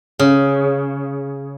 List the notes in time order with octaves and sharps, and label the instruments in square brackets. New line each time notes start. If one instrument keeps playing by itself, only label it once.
[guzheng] C#3